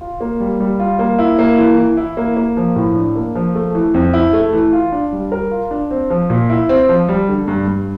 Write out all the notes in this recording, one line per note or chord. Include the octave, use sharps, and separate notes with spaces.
F4
A#3
G3
G3
F4
A#3
E4
A#3
E3
E3
E4
A#3
A#3
F3
A2
D4
A#3
F3
A3
E3
F2
E4
A3
E3
F4
D4
G3
A#4
F4
D4
C4
F3
A#2
E4
C4
F3
G3
D3
G2
G2